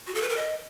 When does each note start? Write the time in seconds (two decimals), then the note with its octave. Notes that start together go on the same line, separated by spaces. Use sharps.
0.07 F#4
0.14 A4
0.22 B4
0.29 A#4
0.36 D#5